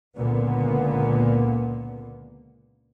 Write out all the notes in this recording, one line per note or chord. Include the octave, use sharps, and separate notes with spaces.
C#2 A#2 D3 A#3 B3